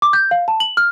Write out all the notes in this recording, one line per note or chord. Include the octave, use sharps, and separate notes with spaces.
D6
G6
F5
A5
F#7
F6